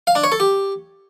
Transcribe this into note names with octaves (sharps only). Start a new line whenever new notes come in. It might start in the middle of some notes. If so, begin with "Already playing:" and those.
F5
D4
C#5
A4
G4